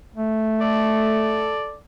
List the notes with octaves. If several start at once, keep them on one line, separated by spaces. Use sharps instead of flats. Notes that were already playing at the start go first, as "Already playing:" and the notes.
A3
A4 D5